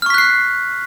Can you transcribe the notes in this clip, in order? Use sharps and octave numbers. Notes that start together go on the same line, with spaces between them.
C#6 F6 F#6 B6 C7